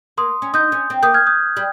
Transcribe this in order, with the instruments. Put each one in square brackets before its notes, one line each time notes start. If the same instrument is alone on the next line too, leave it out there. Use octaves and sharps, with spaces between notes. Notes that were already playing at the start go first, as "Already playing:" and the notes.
[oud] A#3 [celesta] C6 D#6
[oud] C#4
[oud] D#4 [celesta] D#6 G6
[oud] C#4
C4
[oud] A#3 [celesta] D#6 G6
[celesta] F6 G#6
D#6 G6
[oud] G3